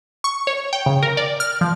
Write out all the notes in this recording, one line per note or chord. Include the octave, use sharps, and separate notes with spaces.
C#6
C#5
G5
C#3
A#4
D5
F6
F3